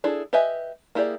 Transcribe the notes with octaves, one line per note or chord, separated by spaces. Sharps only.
D4 E4 G#4 A4
G4 B4 D#5 E5 G#5
A#3 E4 G4 G#4 D5